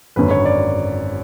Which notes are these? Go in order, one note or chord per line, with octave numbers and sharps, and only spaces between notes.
G#1 F#2 D3 B4
C#5
D5